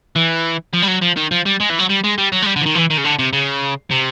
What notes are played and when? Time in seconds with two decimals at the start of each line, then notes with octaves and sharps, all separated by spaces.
0.16 E3
0.74 F3
0.83 G3
0.88 F#3
1.02 F3
1.17 D#3
1.31 F3
1.45 G3
1.60 G#3
1.69 E3
1.79 F#3
1.89 G3
2.04 G#3
2.18 G3
2.32 F#3
2.42 G#3
2.46 G3
2.56 D3
2.62 E3
2.66 D#3
2.75 E3
2.90 D#3
2.98 C#3
3.04 D3
3.19 C3
3.33 C#3
3.91 C3